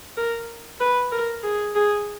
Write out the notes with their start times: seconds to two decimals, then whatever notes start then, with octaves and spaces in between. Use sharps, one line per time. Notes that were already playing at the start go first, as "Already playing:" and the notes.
0.17 A#4
0.80 B4
1.12 A#4
1.43 G#4
1.75 G#4